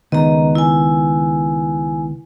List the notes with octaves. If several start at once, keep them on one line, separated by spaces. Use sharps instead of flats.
C#2 D#3 B3 D#5 A#5
E4 G#5